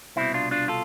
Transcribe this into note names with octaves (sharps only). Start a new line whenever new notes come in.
C2 B2 C4 E4
D4 F4
D4 F4
F4 A4